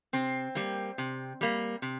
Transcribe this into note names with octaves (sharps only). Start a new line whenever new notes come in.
C3 C4
G3 A#3
C3
G3 A#3
C3